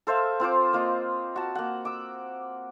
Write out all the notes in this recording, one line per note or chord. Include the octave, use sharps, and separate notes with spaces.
A4 C5 E5 F5
C4 F4 C5 D6
A#3 F4 D#5
F#4 A5
A#3 F#5
D6 E6